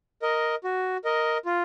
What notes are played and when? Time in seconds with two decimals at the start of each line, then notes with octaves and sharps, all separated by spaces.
0.22 A#4 D#5
0.64 F#4
1.05 A#4 D#5
1.46 F4